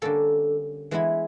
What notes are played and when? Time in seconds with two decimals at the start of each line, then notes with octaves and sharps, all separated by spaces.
0.02 D3 G3 A#3 C#4 A4
0.91 E3 G#3 B3 E4